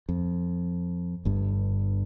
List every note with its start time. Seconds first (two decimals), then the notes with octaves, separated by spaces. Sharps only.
0.09 F2
1.25 G1 G2